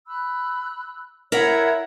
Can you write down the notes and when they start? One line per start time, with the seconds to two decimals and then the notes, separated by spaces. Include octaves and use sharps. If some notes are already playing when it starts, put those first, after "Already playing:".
0.07 B5 E6 F#6
1.32 E4 A#4 C#5 E5 F#5 G#6